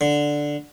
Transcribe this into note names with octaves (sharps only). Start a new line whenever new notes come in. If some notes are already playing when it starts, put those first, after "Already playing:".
D3